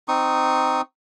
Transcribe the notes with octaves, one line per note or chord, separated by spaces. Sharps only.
C4 D#4 C#6 D#6